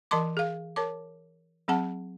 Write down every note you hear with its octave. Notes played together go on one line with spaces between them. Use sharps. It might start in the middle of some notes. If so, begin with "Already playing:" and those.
E3 A#4 D#5 A5 C6 D6
G#4 F5
A#4 C#5 A5 D6
F#3 C4 G#4 F#5 A5